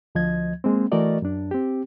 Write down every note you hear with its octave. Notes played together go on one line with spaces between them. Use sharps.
D2 F3 D#5 G#6
G#3 A#3 C4
E3 A3 F#4 A#4 D5 D#5
F#2 D4
C4 G4